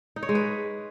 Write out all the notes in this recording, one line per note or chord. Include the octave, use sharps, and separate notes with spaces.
D#4
C#5
G#3
B4